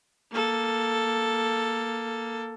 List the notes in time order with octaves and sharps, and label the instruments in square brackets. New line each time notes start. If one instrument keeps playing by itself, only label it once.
[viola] A#3 A4